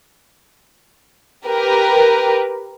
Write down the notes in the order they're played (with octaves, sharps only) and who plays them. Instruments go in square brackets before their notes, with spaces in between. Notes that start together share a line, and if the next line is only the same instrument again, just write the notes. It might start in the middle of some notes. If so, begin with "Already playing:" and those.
[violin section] G4 A#4 B4